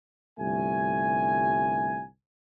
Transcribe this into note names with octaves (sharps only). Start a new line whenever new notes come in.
G1 C2 A3 G#5